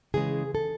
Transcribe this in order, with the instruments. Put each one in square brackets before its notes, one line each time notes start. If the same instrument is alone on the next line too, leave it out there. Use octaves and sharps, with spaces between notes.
[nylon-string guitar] C#3 E3 G#3 G#4
A4